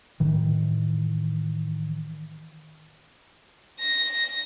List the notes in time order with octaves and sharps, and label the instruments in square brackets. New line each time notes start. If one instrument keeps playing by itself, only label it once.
[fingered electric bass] A2 D#3 E3
[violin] A#6